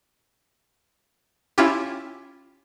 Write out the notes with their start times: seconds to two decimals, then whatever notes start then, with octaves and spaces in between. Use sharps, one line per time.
1.58 C#4 E4 F4 G4